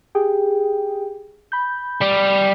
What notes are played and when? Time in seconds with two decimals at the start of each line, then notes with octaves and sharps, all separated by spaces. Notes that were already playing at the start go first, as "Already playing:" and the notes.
0.15 G4 G#4 G5
1.52 B5 G6
2.02 G3